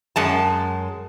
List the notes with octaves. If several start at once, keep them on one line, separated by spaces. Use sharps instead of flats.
F#2 G#3 A5